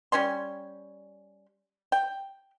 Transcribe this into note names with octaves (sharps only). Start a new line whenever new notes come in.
G3 C#4 G#5 C6
G5